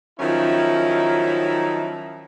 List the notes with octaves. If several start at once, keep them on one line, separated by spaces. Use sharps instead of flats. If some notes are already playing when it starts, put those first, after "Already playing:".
D#3 F3 F#3 C#4 D#4 E4